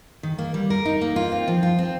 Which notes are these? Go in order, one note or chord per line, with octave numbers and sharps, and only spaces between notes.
D#3
A#3
G3
A#4
D#4
A#3
F4
C4
F3
F4
C4